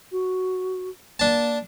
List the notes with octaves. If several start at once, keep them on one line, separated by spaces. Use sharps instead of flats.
F#4
A#3 D4 A5